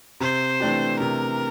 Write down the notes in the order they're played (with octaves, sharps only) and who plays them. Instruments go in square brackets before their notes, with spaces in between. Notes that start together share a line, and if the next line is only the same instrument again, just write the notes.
[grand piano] C3 [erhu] C5
[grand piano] E3 A3 D4 G4
[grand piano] C3 [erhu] A#4